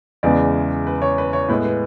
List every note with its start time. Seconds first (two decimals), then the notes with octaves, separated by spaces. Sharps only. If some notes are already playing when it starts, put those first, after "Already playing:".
0.23 E2 C#3 E3 G#3 B3 D5
0.87 B4
1.02 C#5
1.18 B4
1.33 C#5
1.49 A2 G#3 B3 B4
1.65 B4